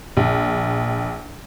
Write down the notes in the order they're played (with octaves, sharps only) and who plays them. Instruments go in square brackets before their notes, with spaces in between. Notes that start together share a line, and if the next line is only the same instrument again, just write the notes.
[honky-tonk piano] A#1